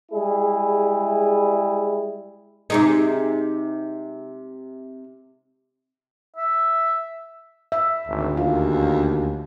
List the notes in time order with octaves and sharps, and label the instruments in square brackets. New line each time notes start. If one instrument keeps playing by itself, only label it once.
[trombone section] G3 G#3 E4 G#4
[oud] C3 G#3 D#4
[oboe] E5
[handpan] E5
[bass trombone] G#1 [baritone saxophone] D2
[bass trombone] D#2 [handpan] F4